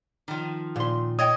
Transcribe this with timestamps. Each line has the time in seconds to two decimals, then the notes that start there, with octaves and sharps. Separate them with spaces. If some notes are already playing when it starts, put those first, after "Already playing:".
0.28 D#3 F3
0.76 A#2 C6
1.19 C#5 D#5 G5 D#6